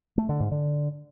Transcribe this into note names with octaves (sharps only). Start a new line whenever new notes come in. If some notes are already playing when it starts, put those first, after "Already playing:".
A3
D3
G#2
D3